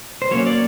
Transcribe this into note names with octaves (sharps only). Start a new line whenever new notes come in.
C5
F#3 A#3 C#4 C#5
D5